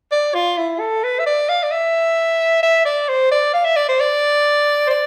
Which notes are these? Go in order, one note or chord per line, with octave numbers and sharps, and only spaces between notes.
D5
F4
E4
A4
B4
E5
D5
F5
D5
E5
E5
D5
C5
D5
F5
E5
D5
C5
D5
C5
D5